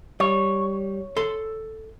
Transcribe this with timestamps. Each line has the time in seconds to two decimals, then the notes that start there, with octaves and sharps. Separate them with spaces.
0.20 G3 C#5
1.17 A4 C6